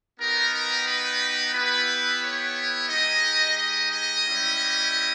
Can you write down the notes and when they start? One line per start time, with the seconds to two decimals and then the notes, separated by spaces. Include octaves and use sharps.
0.19 B3 D#4 G4 A#4
0.53 A#4
0.86 B4
1.54 B3 E4 G4 B4
2.22 C#5
2.89 G#3 D#4 G4 D#5
3.57 D#5
3.91 D#5
4.24 G3 C#4 E4 G4